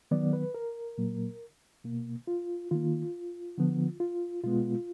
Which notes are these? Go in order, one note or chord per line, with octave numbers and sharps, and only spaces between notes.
D#3 F#3 B3 D5
B4
A#4
A#2 F#3 A#3
B2 A#3
F4
D#3 A#3 F4
D3 F3 B3
F4
B2 G#3 B3 F4